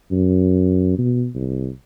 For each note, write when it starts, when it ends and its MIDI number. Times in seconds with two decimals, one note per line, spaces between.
0.11 0.93 42
0.98 1.28 47
1.35 1.70 36